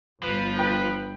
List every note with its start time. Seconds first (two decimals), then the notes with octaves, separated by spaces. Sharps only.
0.23 G1 F3 B4
0.59 B4 G5